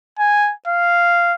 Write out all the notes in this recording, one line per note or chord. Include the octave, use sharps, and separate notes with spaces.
G#5
F5